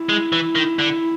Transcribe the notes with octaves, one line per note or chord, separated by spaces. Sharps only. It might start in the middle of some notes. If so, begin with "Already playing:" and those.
Already playing: E4
G#3
E3
D#3
D3